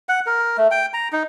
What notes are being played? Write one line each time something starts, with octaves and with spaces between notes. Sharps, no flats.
F#5
A#4
A3
G5
A#5
D#4